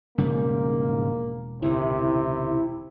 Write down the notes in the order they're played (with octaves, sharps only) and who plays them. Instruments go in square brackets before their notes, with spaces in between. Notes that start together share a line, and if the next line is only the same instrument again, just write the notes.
[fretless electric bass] E1 [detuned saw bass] G#2 [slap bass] C#3 F3 G3 [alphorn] A#3
[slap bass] C#2 A2 D#3 [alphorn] C3 [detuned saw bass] E4